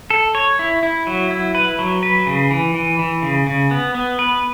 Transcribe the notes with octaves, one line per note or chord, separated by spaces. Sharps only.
A4
C#5
E4
E4
F#3
E4
B4
F#3
B4
C#3
E3
E3
E3
C#3
C#3
B3
B3
B4